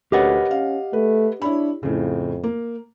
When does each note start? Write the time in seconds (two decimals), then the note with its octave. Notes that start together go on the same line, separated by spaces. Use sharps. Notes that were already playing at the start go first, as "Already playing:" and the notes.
0.12 D2 G4 A#4 B4 C#5 D#5 F#5
0.51 C#4 F5
0.93 A3 B4
1.42 D4 E4 C#5 B5
1.83 F2 A2 C#3
2.44 A#3